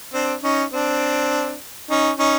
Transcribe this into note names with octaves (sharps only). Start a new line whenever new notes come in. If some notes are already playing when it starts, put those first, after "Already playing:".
C4 D4
C#4 D#4
C4 D4
C#4 D#4
C#4 D#4